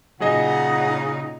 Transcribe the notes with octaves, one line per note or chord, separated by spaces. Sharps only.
A#2 C#3 F#3 D#4 G#4 D#5 F#5